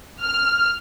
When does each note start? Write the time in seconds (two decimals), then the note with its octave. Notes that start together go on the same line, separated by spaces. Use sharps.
0.21 F6